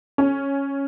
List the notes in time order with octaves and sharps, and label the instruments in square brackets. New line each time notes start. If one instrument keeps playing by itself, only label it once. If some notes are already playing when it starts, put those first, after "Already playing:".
[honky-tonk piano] C#4